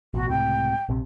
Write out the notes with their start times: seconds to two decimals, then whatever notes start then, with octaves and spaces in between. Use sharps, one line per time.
0.14 A1 B2 F#4
0.29 C#2 A2 C3 G5
0.89 A#1 C3